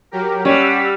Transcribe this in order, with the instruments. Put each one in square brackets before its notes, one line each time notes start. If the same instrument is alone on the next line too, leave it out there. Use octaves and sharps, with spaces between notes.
[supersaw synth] F#3 G4 A#4
[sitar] G3 [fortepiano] C#4 [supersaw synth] G4 F#5 E6